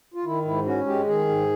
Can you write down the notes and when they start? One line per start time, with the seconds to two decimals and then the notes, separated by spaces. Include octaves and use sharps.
0.14 F4
0.25 D#3 E4
0.45 G#2 E4
0.65 C#4 F#4
0.87 G#3 G4
1.07 D#3 G#4
1.28 G#2